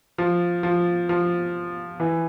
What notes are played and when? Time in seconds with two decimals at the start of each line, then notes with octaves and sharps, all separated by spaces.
0.18 F3
0.63 F3
1.09 F3
2.00 E3